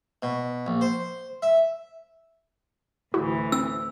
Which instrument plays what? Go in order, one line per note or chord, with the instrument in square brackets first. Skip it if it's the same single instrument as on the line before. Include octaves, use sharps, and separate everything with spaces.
[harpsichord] B2
A#1
C5
E5
[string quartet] D2 A2 E3 [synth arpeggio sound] E4 F#4
[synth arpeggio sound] C4 [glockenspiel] E6